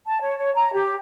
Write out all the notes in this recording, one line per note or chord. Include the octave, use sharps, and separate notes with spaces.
A5
C#5
C#5
A#5
G4